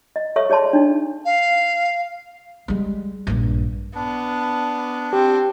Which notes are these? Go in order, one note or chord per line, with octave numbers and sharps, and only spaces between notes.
D#5
A4 C#5 E5 C#6 D#6
G#4 C#5 D5 A5 C6
D4 D#4
F5
G3 G#3
A#1 G2
B3 D4
C4 G4